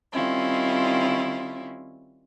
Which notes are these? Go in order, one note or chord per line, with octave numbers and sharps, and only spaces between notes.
D#3 G3 C4 C#4 E4 F4